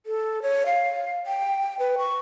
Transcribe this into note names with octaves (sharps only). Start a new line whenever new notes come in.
A4
C#5
F5
G5
B4
C#6